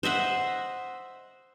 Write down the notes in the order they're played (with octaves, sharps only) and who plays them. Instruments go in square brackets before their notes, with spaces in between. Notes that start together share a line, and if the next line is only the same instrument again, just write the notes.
[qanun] C5 D#5 E5 F#5